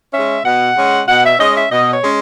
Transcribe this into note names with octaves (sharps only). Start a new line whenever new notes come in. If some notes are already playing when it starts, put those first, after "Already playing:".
G#3 C#4 E5
B2 F#5
G#3 C#4
B2 F#5
E5
G#3 C#4 D#5
E5
B2 D#5
C#5
G#3 C#4